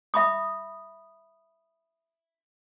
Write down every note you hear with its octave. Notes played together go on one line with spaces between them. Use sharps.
E5 B5 D#6